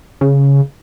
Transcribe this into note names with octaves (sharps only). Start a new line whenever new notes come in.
C#3